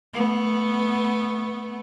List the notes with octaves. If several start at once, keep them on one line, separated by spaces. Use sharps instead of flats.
A3 B3